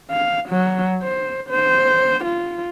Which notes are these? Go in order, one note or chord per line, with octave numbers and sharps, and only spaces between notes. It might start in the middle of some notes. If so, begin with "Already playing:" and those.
F5
F#3
C5
C5
F4